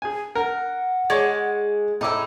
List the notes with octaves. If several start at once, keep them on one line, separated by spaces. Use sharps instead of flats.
G#4 G#5
A#4 F#5
G#3 C#5 D5
A2 D#4 E4 D6 E6